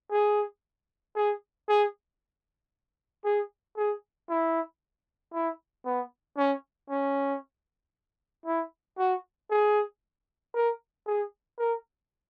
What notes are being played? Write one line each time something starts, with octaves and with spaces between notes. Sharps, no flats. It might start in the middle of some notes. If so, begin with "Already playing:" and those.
G#4
G#4
G#4
G#4
G#4
E4
E4
B3
C#4
C#4
E4
F#4
G#4
A#4
G#4
A#4